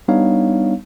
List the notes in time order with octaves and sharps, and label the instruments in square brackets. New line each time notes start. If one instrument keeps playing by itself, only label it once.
[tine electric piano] G3 B3 D4 D#4 C#5 F5